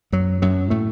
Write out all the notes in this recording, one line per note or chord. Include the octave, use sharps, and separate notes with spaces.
F#2 F#3
F#2 F#3
A2 A3